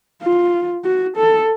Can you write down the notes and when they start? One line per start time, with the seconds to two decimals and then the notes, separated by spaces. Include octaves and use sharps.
0.23 F4
0.85 F#4
1.17 A4